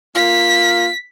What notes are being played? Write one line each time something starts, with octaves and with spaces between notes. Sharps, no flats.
A#3 F4 B6